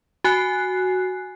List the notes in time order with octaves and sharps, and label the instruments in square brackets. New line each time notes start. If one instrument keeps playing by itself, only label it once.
[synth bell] F#4 G#5 F#6 C7